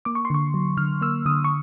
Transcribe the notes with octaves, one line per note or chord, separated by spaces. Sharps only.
A#3 D6
C#6
C6
D3 C#6
F#3
D3 F6
A#3 E6
D3 D#6
C#6